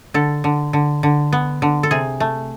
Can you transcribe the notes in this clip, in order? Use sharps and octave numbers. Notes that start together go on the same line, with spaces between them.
D3 A4
D3
D3
D3
B3
D3
A4
C3 G#4
A3